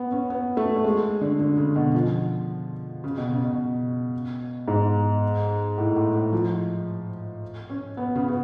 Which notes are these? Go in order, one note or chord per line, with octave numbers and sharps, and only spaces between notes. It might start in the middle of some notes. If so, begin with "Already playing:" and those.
Already playing: B3
C#4
B3
A3
A3
G#3
D3
D3
C#3
B2
F3
C#3
B2
C#3
B2
G#2
A2
A2
A2
F3
C#4
B3
C#3
B3